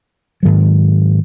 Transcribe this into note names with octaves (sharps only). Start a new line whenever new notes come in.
G#2 D#3 F#3